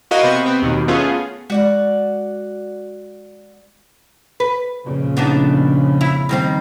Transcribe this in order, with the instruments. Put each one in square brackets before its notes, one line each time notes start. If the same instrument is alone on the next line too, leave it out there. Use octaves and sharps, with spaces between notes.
[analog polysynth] E4 F#4 A#4 D#5 F5 F#5
C3 B3 C5 C#6
B3 C4
D#2 B2 D#3
A3 B3 C#4 F4 G#4
[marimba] G#3 [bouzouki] F#4 D5 F#5
[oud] B4
[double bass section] F2 A#2 C#3
[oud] B3 D4 D#4
E4
D#3 G3 C4